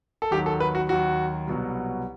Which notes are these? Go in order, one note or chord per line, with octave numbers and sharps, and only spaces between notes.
A4
D#2 D#3 F#3 G4
A4
B4
F#4
D#2 D#3 F#3 F#4
C2 B2 F#3